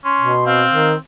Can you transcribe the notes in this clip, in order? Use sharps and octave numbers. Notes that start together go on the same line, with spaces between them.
C#4 C6
B2
C4 F5
D#3